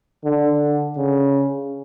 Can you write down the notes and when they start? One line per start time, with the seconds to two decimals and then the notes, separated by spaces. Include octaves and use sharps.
0.25 D3
0.96 C#3